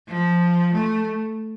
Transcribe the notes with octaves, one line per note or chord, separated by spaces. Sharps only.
F3
A3